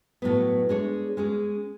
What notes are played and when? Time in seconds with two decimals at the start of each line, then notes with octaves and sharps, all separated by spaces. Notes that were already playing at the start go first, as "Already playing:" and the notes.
0.22 A2 F#3 B3
0.69 G#3 D4 G#4 C#5
1.17 G#3 C#4 G#4